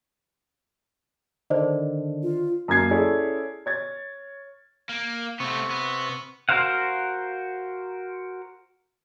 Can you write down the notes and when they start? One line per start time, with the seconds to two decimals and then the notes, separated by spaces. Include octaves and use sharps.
1.50 D3 D#3 D4 C5 D5 D#5
2.23 F4
2.68 F#2 A#3 G#6 C7
2.91 C#4 E4 G#4 A4 C#5 D5
3.66 C#5 G#6 A6
4.89 A#3
5.40 C3 A3 B3 C#6
5.70 B3
6.49 F#4 A#4 C5 F5 F#5